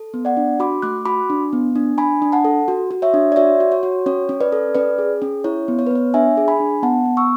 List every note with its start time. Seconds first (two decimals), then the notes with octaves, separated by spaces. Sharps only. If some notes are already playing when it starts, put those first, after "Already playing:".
Already playing: A4
0.14 B3
0.25 D5 F#5
0.37 D4
0.60 F#4 B5 D6
0.82 A3 D6 F#6
1.06 F#4 B5 D6
1.30 D4
1.53 B3
1.76 D4
1.98 D4 G#5 B5
2.22 D4
2.32 F#5 A5
2.45 A4
2.68 F#4
2.91 F#4
3.02 C#5 E5
3.14 D4
3.32 D5
3.36 F#4 C#5 E5
3.60 F#4
3.72 C#5
3.83 F#4
4.06 C#4 C#5
4.29 C#4
4.40 B4 D5
4.52 A4
4.75 C#4 B4 D5
4.98 G#4
5.22 C#4
5.44 E4 C#5
5.68 B3
5.79 C#5
5.87 B4
5.91 B3 C#5
6.14 D4 E5 G#5
6.37 G#4
6.48 G#5 B5
6.60 D4
6.83 B3 F#5 A5
7.05 B3
7.17 C#6 E6